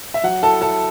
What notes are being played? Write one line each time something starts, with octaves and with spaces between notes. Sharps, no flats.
E5
F#3 F#5
E4 A4 A5
E4 A4 A5